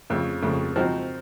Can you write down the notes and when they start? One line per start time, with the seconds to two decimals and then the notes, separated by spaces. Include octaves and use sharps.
0.10 F2 C#3 A3
0.42 F2 C#3 A3
0.76 F3 C4 D#4 F#4